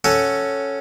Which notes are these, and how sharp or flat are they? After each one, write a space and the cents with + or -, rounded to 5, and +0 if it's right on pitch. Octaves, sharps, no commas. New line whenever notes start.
C#4 +0 F#4 +5 A4 +0